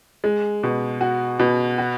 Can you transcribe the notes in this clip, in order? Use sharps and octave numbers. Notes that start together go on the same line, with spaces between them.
G#3
B2
F#4
B2
F#4